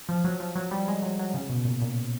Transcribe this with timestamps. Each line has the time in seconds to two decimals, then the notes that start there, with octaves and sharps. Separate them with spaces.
0.09 F3
0.24 F#3
0.40 F3
0.56 F#3
0.71 G3
0.88 G#3
1.02 F#3
1.19 F#3
1.34 C#3
1.49 B2
1.65 A#2
1.82 A#2